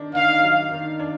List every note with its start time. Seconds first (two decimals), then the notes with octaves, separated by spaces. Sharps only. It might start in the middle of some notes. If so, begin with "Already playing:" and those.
Already playing: D#3 D4
0.13 D#3 F5
0.42 F#3
0.71 D#3
0.99 D4